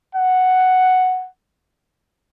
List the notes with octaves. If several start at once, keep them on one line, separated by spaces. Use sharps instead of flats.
F#5